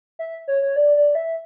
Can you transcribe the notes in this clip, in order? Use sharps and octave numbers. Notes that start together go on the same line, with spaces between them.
E5
C#5
C#5
D5
D5
E5